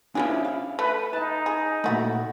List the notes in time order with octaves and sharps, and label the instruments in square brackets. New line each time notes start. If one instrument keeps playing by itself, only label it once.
[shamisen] F3 C#4 G#4 [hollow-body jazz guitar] D4 E4 F4
[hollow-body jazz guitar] F5
[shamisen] A3 [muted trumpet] B4
[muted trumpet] D#4 [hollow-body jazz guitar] A5
[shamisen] G#4
[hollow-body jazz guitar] A#2 A3 [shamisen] E4 F#4